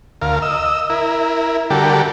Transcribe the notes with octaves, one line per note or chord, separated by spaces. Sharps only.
D2 A#4 F5
D#5 E6
E4 A#4
D3 G3 F#4 G4 A4 A#4